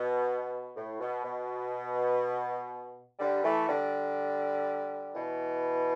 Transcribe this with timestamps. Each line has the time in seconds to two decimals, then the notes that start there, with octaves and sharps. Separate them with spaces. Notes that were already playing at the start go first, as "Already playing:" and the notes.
Already playing: B2
0.75 A2
1.00 B2
1.24 B2
3.19 D3 G3
3.43 E3 A3
3.68 D3 G3
5.14 B2 E3